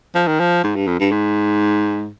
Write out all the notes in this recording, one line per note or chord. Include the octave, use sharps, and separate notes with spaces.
F3
D#3
F3
G#2
G2
F2
G2
G#2